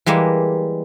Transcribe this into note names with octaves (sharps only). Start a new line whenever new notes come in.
E3 G3 G#3 A#3